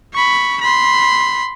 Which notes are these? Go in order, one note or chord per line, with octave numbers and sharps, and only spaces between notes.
B5 C#6
B5 C6